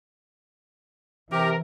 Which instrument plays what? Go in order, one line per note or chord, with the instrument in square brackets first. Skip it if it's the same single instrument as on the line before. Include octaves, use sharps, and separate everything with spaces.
[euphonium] C3 [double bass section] E3 [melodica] G4 [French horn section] A#4